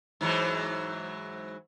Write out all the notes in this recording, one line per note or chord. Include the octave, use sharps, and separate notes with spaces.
G#2 E3 F#3